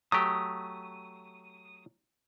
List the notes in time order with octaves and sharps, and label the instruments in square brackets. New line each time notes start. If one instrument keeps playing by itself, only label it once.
[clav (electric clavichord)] F#3 A3 G4 [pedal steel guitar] D#6